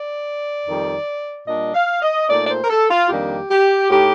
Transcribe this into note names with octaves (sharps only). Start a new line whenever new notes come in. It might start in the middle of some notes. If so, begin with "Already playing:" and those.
Already playing: D5
F2 D#3 G3
A#2 G3 D4 D#5
F5
D#5
A#2 A3 D#4 D5
D5
C5
A#4
A4
F4
F2 D#3 G3 A#3 D4 G4
G4
A2 A3 D#4 G4